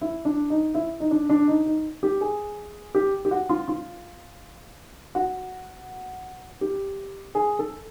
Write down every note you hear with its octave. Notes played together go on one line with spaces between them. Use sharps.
E4
D4
D#4
E4
D#4
D4
D4
D#4
D#4
G4
G#4
G4
G4
F#4
F4
F4
F#4
G4
G#4
A4